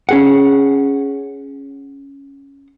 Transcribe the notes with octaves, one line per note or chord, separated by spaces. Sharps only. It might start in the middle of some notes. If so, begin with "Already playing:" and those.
C#4 G#4 F#5